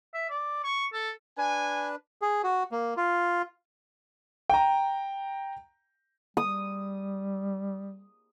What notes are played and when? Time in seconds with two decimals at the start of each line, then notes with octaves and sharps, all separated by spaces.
0.14 E5
0.30 D5
0.64 C#6
0.93 A4
1.38 D4 B4 G#5
2.22 G#4
2.44 F#4
2.72 A#3
2.97 F4
4.50 G5 A#5
6.37 G3 D#6